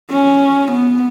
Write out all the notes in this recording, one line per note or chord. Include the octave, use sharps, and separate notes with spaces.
C#4
B3